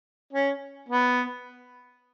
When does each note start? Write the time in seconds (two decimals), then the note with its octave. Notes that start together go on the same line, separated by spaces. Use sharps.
0.33 C#4
0.89 B3